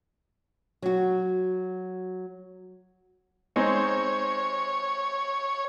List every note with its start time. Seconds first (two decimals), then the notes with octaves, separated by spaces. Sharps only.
0.82 F#3 F#4
3.56 G#3 C4 D#4 C#5